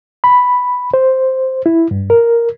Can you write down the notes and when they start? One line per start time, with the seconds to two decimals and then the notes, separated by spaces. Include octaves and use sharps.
0.24 B5
0.94 C5
1.66 E4
1.91 G2
2.10 A#4